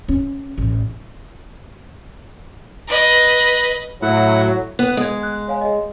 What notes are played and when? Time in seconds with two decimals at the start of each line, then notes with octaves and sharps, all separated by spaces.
0.08 C#4
0.58 A1
2.88 B4 D#5
4.02 A2 F#3 E4 F#5
4.79 B3 F#6
4.97 G#3 D#6 G#6
5.23 F#6
5.48 C#5 F5 G#5
5.61 G#4 D#5